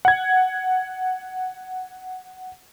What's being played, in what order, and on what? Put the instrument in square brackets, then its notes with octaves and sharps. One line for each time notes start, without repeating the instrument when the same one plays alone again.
[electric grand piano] F#5 G#6